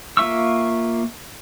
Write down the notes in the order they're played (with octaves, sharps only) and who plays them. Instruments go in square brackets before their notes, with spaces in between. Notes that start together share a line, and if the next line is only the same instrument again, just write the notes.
[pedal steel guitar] A#3 F4 E5 C#6 E6